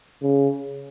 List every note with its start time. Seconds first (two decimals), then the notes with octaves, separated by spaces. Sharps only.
0.22 C#3